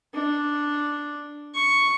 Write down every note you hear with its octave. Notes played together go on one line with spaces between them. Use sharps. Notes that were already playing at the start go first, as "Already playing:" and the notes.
D4
C#6